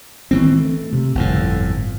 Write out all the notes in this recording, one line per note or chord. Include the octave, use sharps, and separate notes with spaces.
D#3 E3 C4
A3
C3
G1 F2 A2